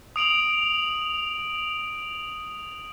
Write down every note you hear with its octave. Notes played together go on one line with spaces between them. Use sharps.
D#6 D7 F7 F#7